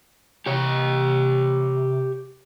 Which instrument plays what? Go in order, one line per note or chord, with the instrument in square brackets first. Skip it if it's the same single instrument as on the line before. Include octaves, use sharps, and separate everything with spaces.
[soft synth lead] C3 [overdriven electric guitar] G4 C#5